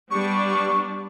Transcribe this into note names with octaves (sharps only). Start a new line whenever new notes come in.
G3 B3 D4 C#6